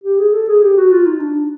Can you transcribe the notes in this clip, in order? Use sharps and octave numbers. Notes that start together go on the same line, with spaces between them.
G4
G#4
A4
G#4
G4
F#4
F4
D#4
D4